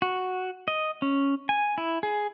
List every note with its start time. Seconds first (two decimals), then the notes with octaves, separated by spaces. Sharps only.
0.02 F#4
0.68 D#5
1.02 C#4
1.49 G#5
1.78 E4
2.03 G#4